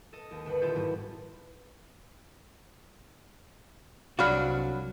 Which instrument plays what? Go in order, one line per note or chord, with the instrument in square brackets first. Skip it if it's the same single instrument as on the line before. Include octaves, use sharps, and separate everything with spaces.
[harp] A4 D#5
D#2
G1 B4 F#5
D#1 E4 F4 A4 G6
G#2 G3 B3 F#4
[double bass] C2 [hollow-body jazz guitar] F#3 D4 F#4 [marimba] F5 B5 F6